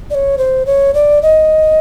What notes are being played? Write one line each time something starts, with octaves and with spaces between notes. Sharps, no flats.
D5
C#5
C5
C#5
D5
D#5